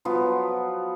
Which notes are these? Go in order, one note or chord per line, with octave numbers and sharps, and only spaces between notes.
F3 F#3 B3 F4